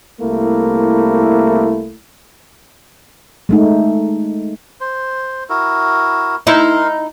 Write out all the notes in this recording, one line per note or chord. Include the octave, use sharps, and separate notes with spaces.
C2 A3 A#3 E4
G#3 A3 D#4
C5
E4 F#4 A#4
D#4 E4 A#4 C6